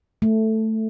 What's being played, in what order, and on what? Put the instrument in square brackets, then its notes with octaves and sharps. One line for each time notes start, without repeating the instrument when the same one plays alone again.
[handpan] A3